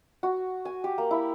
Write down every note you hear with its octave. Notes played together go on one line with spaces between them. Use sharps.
F#4
G#5
G4
A#3
E4